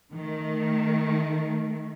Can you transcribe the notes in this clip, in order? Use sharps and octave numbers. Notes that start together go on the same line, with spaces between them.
D#3 A3